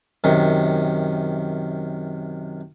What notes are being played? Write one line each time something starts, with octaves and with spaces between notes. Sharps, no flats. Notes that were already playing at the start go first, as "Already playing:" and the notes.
F#2 C3 D#3